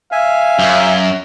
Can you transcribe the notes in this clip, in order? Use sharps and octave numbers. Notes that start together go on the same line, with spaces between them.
E5 F5 G#5
F#2